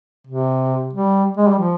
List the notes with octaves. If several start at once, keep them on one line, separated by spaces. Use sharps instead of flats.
C3
G3
G#3
G3
F3